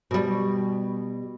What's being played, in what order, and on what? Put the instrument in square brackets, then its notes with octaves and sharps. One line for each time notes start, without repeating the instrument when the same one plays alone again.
[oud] B2 G3